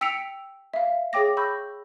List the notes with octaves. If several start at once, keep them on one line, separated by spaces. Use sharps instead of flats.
G5 E6 B6 C#7 D7 F7
E5 F5
G#4 C#5 G5 D6 A#6
B5 C#6 E6 G6 A#6